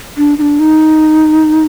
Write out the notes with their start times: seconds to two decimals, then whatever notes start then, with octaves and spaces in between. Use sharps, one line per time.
0.18 D4
0.38 D#4
0.42 D4
0.60 D#4